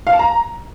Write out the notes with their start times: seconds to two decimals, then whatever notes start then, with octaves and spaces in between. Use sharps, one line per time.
0.07 F5
0.13 A5
0.19 A#5